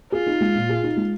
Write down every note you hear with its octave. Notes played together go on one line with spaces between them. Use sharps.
F4 G#4
D#4
G#3
A#2
G#4
D#4
G#3